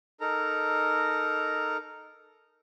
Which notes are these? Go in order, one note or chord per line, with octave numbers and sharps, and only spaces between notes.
D#4 A4 A#4 A#5